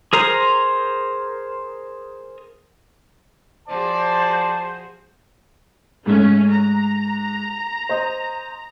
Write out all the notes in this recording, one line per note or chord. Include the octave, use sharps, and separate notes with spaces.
G#4 A#4 C5 A#5
F3 F#4 G#4 C5 D5 A5
G#2 A3 C#4
A#5
C5 D#5